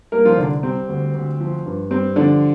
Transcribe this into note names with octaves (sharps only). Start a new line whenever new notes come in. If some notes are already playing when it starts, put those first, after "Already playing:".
G3 A#3 A#4
F3 F4
C2 D3 D4
G3 C4
D2
D2
F3
G2
G3 C4
D3 F3 D4